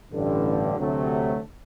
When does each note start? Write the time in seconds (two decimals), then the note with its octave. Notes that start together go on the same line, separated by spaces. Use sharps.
0.12 A1 G2 D3
0.76 D2 C3 F#3 A3